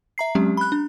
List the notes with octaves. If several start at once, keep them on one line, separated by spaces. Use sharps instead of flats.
E5 A#5 C7
F#3 G#3 C4 C#4 G4
B5 F#6
D4